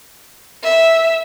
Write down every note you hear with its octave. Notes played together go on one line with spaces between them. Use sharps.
E5